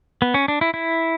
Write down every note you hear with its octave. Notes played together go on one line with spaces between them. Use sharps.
B3
C#4
D4
E4
E4